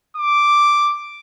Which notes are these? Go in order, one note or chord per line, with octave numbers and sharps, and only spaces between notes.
D6